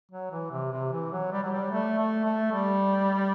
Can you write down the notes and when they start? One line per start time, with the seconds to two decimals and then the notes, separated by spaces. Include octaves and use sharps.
0.11 F#3
0.31 E3
0.51 C3
0.72 C3
0.92 E3
1.12 F#3
1.32 G3
1.44 F#3
1.52 G3
1.71 A3
1.98 A3
2.25 A3
2.52 G3